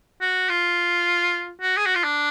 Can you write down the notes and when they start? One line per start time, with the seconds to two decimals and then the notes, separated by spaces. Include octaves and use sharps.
0.21 F#4
0.49 F4
1.61 F#4
1.77 G#4
1.86 F#4
1.95 F4
2.04 D4